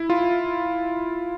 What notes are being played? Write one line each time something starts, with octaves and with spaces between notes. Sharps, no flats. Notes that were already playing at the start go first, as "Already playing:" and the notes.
Already playing: E4
F4